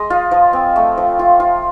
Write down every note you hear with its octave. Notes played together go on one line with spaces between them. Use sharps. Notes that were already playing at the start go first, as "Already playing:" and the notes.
Already playing: G#3 D#5
F4
F3
C4
A3
F3
F4
F4